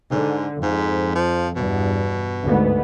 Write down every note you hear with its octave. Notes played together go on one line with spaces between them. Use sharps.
G#2 D3
F2 G#2
F3
E2 G2 B2
D2 G#2 B3